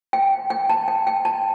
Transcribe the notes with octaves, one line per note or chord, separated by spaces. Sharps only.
G5
G5
A5
G5
G5
A5